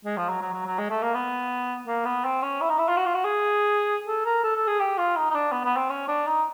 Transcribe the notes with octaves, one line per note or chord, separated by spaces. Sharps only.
G#3
F3
F#3
F#3
F#3
F#3
G#3
A3
A#3
B3
A#3
B3
C4
C#4
E4
D#4
E4
F4
F#4
F4
F#4
G#4
A4
A#4
A4
A4
G#4
G4
F4
D#4
D#4
D4
B3
B3
C4
C#4
D4
D#4